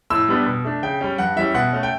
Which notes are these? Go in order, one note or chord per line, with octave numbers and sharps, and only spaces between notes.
A2 E6
G3 B3 D4
B2
A3 D4
C#3 G5
G3 C#4
G2 F#5
E3 G3 C#4 E5
B2 F#5
A3 C#4
G5